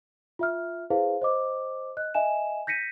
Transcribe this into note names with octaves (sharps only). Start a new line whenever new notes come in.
F4 E5 F6
E4 G#4 B4 C5 F5
C5 D#5 D6
D#5 F#6
D#5 E5 G#5 E7
G6 A#6 B6 C#7 D#7